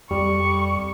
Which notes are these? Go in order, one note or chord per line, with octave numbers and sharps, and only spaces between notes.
F2 G3 C#6